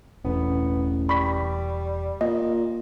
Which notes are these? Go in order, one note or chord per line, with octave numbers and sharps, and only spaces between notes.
E1 A1 B3
G3 B5 C#6 B6
A#2 D#5